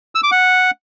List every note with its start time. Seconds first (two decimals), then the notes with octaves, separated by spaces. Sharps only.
0.15 E6
0.23 D6
0.31 F#5